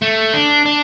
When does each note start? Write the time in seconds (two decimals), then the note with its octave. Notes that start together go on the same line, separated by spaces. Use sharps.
0.02 A3
0.34 D4
0.66 D4